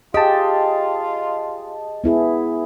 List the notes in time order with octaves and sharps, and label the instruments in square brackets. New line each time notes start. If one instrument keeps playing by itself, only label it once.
[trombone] F4 [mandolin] G4 [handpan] G#4 [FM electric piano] D#5 A5
[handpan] B3 E4 G#4